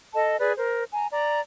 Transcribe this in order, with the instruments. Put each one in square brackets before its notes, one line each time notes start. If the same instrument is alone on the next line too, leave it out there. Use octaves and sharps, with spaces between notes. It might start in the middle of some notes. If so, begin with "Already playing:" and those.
[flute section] A4 D#5 A5
G#4 B4 D5
A#4 C5
G#5 A#5
D5 A#5